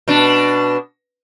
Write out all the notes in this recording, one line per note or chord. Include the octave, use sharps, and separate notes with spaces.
B2 D4